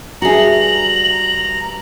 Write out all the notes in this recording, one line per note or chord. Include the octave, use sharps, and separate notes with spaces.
G2 F#4 G#4 E5 A5 A#5 F#7